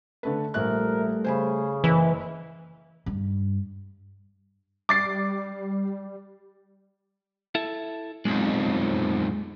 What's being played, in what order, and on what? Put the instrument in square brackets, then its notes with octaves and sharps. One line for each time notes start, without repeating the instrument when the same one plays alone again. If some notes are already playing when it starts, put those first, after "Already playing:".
[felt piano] D3 A3 B4
[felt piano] A#1 E5 F#6 [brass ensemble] G3 A3 [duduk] A#4
[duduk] C#3 [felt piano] C5 G#5 B5
[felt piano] F#1 [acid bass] E3
[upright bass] G2
[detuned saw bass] G3 [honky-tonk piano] D6 A6 C7
[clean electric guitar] E4 A4 E5
[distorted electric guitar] B1 F2 [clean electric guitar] G#3